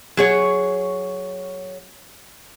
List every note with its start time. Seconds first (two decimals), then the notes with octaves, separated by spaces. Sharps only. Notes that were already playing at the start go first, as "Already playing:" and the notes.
0.17 F#3 G#4 C#5